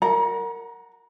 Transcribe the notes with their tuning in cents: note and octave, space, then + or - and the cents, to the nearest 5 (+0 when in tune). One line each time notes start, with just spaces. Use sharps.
A#4 -15 F#5 +0 A#5 +35